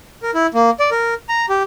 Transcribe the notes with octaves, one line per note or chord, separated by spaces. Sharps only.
A#4
E4
A#3
D5
A#4
A#5
G4